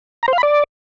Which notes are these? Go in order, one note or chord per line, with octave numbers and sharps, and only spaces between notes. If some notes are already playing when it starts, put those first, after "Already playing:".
A#5
C5
F5
B5
D5